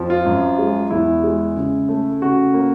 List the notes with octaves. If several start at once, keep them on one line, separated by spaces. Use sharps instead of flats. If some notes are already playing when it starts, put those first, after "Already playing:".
Already playing: F2 F3
F4
F#2
G#3
E2 E4
G#3
C#3
A3
C#3 F#4
A#3